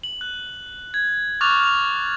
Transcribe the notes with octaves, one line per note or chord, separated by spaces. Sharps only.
F#7
F#6
G#6
C#6 D6 F6 F#6 A6 F7
F6 F7